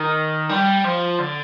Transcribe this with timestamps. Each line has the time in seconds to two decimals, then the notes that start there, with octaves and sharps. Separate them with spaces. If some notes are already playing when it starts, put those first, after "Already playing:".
Already playing: D#3
0.49 G3
0.84 F3
1.19 D3